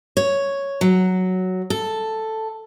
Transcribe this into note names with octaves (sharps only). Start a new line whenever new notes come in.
C#5
F#3
A4